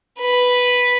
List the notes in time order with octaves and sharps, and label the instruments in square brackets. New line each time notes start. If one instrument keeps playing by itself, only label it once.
[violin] B4